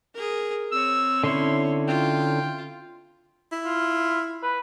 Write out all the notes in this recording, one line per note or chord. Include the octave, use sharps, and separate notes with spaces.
G#4 A#4
C4 C#5 E6
D3 C#4 E4 C6
F4 G5
E4
F4
B4